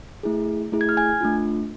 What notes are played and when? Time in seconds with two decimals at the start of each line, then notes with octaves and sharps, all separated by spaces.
0.23 A3 E4 G#4
0.72 A3 E4 G#4
0.81 G#6
0.89 F6
0.97 G#5 G#6
1.21 A3 D4 F4